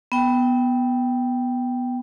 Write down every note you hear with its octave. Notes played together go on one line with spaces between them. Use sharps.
B3 G5